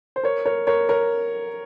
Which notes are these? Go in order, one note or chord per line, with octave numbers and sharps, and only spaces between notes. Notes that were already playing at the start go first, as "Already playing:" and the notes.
C5
A#4 C#5
A#4 C#5
A#4 C#5
A#4 C#5